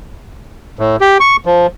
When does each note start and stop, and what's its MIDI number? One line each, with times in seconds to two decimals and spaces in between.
0.79 0.96 45
1.01 1.18 67
1.20 1.36 85
1.46 1.67 53